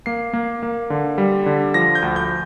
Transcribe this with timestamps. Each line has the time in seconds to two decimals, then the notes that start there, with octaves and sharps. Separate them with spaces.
0.06 A#3 C7
0.33 A#3
0.63 A#3
0.90 D3
1.18 G3
1.46 D3
1.74 F3 A#6
1.95 G6
2.02 D2
2.16 G6